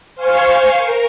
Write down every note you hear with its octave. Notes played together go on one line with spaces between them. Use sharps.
C5 F5 G#5 C#6
A#4